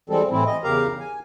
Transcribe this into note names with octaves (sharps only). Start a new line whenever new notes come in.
E3 G3 G#3 C4 A4
A2 E3 C4 E4
D#5
E2 C#3 G4 A#4 F5 A#5
G#5